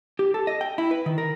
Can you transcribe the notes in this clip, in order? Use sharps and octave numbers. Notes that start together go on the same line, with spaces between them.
G4
A4
D#5
G5
E4
B4
D#3
A#4